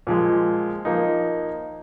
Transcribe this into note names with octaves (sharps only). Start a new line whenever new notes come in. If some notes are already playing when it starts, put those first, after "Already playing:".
A#2 F3 G#3
F3 A#3 D#4